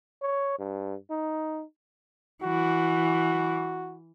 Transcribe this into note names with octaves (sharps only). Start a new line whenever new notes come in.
C#5
G2
D#4
E3 F#4